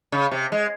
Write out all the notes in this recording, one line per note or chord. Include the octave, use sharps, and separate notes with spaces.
C#3
C3
G#3